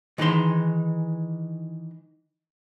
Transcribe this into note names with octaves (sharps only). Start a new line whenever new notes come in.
D#3 E3 G#3 D#4 C6